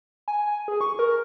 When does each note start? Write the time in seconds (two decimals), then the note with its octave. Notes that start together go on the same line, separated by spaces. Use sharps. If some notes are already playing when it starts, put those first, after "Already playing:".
0.28 G#5
0.68 G#4
0.81 C#6
0.99 A#4